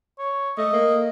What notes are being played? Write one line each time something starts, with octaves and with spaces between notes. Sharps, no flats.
C#5
A3 D#5
A#3